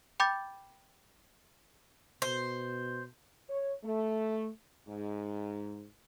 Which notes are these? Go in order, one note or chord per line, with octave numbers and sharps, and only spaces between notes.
G5 B5 D6 G6 A6
B2 C5
C#5
A3
G#2